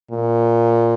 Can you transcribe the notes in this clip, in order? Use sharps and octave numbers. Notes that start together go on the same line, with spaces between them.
A#2